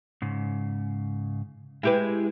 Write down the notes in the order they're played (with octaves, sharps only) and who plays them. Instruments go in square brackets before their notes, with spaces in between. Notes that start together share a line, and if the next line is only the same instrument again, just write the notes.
[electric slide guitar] G#2 C#3
[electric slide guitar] G#3 [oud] E4 G4 B4